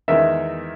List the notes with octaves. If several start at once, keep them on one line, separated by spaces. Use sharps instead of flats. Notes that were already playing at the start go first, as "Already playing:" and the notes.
E2 D#3 G#3 D#4 A#4 E5